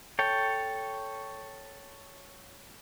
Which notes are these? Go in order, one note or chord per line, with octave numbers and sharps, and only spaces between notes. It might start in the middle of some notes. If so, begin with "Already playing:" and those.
A4 C#5 G5